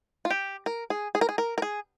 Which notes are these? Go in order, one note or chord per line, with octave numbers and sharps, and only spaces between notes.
F4
G4
A#4
G#4
G#4
A#4
G#4
A#4
A#4
G#4